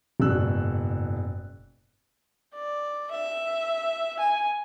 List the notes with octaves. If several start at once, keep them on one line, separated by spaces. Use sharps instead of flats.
F#1 G#2 B2 D5 E6 F#6
D5
E5
G#5